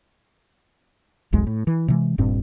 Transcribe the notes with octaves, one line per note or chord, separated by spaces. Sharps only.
F1 B1 F2 G#3
A2
E3
C3 E3 G#3
D#1 G2 A#2 C4